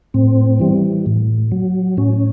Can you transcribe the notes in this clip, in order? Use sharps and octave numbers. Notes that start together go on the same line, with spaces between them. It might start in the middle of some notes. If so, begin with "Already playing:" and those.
A2 C4
E3 G3
A2
F#3
A2 C#4